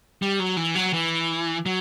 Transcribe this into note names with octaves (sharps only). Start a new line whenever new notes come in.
G3
F#3
E3
F#3
E3
F#3